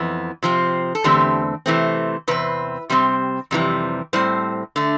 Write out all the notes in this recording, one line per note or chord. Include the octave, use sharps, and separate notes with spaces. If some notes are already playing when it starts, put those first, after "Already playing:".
Already playing: F2 E3 B3
C3 F3 C4
A4
E2 D3 A3 C4 G4
C3 E3 A3 C4
E2 C3 C4 B4
C3 G3 C4
F2 C3 E3 G3
A2 G3 C4 C5
D3 A3